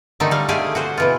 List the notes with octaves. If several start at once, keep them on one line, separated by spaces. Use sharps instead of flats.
D3 D#3 A3 D#4
G3 F5
D3 A3 G4 G#4 F5 G#5
F#4 G#4 C5
B2 E3 F4